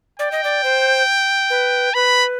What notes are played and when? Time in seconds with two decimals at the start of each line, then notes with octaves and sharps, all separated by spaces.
0.19 D5 G5
0.32 D#5
0.44 D5
0.64 C5
1.50 B4
1.94 B4 B5